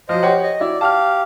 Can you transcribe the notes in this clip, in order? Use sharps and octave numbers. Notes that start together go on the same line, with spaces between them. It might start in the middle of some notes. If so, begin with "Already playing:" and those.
F3 F#3 C5 D#5
G4 C#5 F#5
D#5
F#3 E4 D5
G4 F5 A5 F6